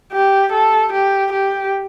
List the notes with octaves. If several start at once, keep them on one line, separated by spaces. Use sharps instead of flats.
G4
A4
G4
G4